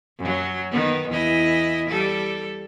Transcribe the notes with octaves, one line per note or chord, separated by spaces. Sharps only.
F#2 F#3
D#3 B3
E2 E4 D#5
G3 A4